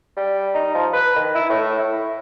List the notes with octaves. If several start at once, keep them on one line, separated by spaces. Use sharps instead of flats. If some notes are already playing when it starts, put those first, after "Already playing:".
G3
D#4
F3
B4
D#3
E4
A2
E4